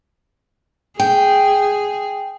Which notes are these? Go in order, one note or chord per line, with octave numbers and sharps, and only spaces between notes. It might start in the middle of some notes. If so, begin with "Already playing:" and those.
G#4 G5